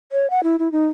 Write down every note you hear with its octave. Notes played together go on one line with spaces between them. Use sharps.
C#5
F#5
E4
E4
D#4